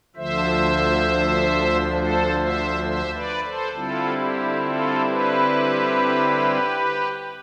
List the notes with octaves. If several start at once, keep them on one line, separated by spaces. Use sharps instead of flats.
D2 D3 F3 C5 E5
A4 C5
C5 E5
C5 E5
B4 D5
A4 C5
D3 G3 C4 E4 F4 A4
G4
F4 A4
G4 B4